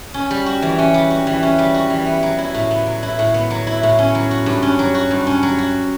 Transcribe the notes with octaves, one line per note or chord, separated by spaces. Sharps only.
C#4
G3
F#4
E3
C#4
G3
F#4
E3
C#4
G3
F#4
E3
B3
F#3
E4
A2
B3
F#3
E4
A2
B3
F#3
E4
A2
C#4
F#3
F#4
G2
C#4
F#3
F#4
G2
C#4
F#3
F#4